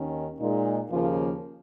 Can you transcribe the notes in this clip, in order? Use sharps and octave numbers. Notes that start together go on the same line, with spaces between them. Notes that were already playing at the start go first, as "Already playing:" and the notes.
Already playing: D#2 D#3 C#4
A#2 G#3 D#4
D#2 C#3 F3 A#3 C#4 F4